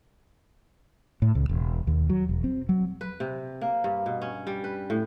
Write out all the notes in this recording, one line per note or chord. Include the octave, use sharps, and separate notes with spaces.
A2
C#2
E1
D#2
F#3
E1
C4
F#3
B4
C3
A#3
G2
B2
C#4
G3
B4
A2